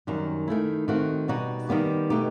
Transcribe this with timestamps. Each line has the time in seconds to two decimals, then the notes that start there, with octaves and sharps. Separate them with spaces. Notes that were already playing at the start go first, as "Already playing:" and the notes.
0.07 F#2 D#3 G3
0.48 D#3 A3 E4
0.88 D#3 A3 C4 F#4
1.28 B2 G3 D#4 F#4
1.69 D#3 G3 B3 D#4 G4
2.10 B2 A3 D#4 G4